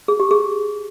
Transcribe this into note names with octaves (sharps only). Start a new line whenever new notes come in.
G#4
G4
G#4